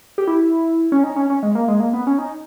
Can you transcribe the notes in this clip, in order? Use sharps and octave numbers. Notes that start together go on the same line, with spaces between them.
G4
E4
C#4
D#4
C#4
C#4
G#3
A#3
G#3
A#3
B3
C#4
D#4